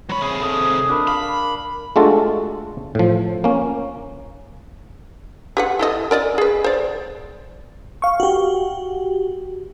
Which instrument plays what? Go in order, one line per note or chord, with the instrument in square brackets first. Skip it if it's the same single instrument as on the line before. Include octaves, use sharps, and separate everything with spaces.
[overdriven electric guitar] F#3 B5 [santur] C#5
[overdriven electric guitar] C3 G#4
[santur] A4 C5 D#5
D4 A#4 B5
[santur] F5 [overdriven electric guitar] B5
[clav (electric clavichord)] G#3 A3 D4 F4 F#4 A4
A2 F3
A#3 C#4
[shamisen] G4 B4 F#5
E4 A4 D#5
A#4 D5 D#5
G#4 B4
C5 D5
[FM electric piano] F5 C#6
F#4 G4